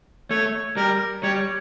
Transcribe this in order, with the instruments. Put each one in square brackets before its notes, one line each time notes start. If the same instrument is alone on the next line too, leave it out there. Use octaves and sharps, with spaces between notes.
[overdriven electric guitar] A3 [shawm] C#5
[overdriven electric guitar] G3 [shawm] A#4
[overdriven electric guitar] G3 [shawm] C#5